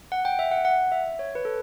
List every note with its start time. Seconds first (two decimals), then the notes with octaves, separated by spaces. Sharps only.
0.12 F#5
0.25 G5
0.39 E5
0.52 F#5
0.65 F#5
0.92 E5
1.19 C#5
1.35 B4
1.45 A4